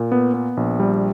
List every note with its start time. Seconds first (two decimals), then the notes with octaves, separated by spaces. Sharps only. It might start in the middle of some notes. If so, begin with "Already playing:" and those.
Already playing: A#2
0.12 B3
0.34 B3
0.57 A#1
0.80 G3